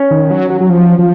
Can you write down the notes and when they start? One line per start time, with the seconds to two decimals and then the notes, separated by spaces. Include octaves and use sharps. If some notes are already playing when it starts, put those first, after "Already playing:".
Already playing: C#4
0.11 D#3
0.30 F#3
0.50 F#3
0.61 F#3
0.70 F3
0.99 F3